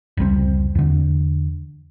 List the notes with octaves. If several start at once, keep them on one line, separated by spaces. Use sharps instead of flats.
F1 C#2 G3 C4
E2 D3